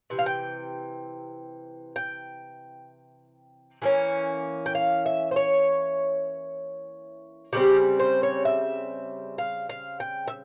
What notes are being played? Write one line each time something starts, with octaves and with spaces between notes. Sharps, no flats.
C3 E3
F5
G5
G5
E3 A#3 C#4
G5
F5
E5
C5
C#5
C#3 G3 C4 G4
C5
C#5
E5
F5
F5
G5
E5